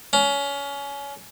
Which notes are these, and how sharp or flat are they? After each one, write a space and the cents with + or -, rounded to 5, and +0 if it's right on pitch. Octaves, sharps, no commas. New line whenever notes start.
C#4 +25